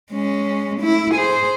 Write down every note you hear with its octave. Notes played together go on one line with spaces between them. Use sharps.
G#3 C#4
A3 E4
G#4 C5